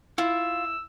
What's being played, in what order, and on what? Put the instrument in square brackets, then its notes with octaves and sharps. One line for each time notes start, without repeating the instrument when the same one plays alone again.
[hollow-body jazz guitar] E4 [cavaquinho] F4 [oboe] E6